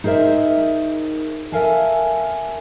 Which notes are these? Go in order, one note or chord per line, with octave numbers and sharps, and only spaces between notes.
D#4 G#4 A#4 C5 E5
A4 A#4 E5 F5 G#5 A5